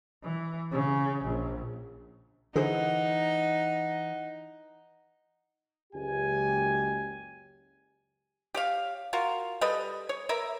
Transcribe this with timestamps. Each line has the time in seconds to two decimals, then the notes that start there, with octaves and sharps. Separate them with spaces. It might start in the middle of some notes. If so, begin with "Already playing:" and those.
0.23 E3
0.71 C#3
1.24 A#1
2.56 D3 E3 D#4 G#4 C5 F#5
5.93 F#1 C#2 G4 G#5
8.54 G4 C#5 F5
9.13 F4 F#4 A#4
9.61 G3 A4 B4 D#5
10.09 C#5
10.29 A#4 B4 E5